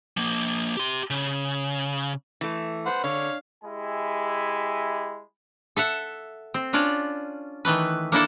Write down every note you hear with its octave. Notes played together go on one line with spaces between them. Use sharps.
F3 A#3
G4 C6
C#3
E3 A3
B4 C5 F#5
D3 C#5 F5
G#3 E4 G4 E5 G#5 B5
A4 E5 F#5
C4
C#4 D4 F4 D5
D#3 E3 A3 B4
A#3 D4 E4 A4